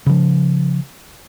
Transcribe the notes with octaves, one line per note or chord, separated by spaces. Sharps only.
C#3 F3